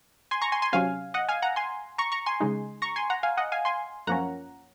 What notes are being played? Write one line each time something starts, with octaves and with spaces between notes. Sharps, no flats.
G#5 C6
A#5 C#6
G#5 C6
G#5 C6
C3 F#3 C#4 F5 G#5
D#5 F#5
F5 G#5
F#5 A#5
G#5 C6
A#5 C#6
A#5 C#6
G#5 C6
C#3 G#3 D#4
A#5 C#6
G#5 C6
F#5 A#5
F5 G#5
D#5 F#5
F5 G#5
G#5 C6
F#2 F3 A#3 C#4 F#5 A#5